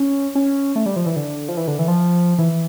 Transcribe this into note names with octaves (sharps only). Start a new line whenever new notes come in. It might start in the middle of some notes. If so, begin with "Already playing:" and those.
Already playing: C#4
C#4
A3
G3
F3
E3
D3
F3
E3
D3
E3
F3
E3